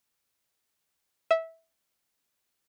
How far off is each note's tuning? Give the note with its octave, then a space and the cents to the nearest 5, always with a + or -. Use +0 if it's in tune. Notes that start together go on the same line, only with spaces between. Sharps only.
E5 -15